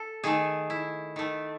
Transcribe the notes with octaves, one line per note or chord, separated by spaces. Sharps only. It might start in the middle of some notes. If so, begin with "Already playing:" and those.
Already playing: A4
D#3 A3 G#4
E4
D#3 A3